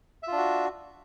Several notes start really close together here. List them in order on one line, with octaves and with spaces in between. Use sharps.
E5 F4 D4 F#4